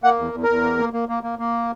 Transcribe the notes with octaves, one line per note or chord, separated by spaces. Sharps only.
A#3 F#5
E2
E2
A#4
E2
A#3
A#3
A#3
A#3
A#3
A#3